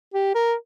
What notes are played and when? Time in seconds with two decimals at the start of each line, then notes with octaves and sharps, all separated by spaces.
0.14 G4
0.35 A#4